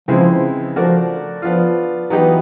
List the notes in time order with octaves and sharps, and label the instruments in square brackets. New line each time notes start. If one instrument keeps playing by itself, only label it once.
[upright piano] C#3 E3 G#3 C4 E4 [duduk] F3
[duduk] F3 [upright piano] A3 D4 F#4 A#4 D5
[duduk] F3 [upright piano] B3 D4 F4
[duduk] E3 [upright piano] F#3 B3 D#4 G4